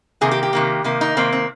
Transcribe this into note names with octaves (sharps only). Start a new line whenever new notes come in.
C3 D#3 A#3 G#4
G4
G4
C3 D#3 A#3
C3 D#3 A#3
D#4
C3 D#3 A#3 C4
C4